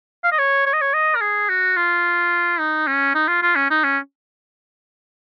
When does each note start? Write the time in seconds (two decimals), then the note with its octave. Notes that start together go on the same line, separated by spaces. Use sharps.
0.24 F5
0.32 D#5
0.39 C#5
0.66 C#5
0.73 D#5
0.81 C#5
0.94 D#5
1.15 A#4
1.21 G#4
1.49 F#4
1.76 F4
2.60 D#4
2.87 C#4
3.15 D#4
3.28 F4
3.42 F4
3.55 C#4
3.70 D#4
3.84 C#4